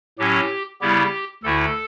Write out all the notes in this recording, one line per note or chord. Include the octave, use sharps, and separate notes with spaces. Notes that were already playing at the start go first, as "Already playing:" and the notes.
A2 F#3 C#4 G4
C#3 G3 B3 E4 G4
D2 D3 A3 E4 A4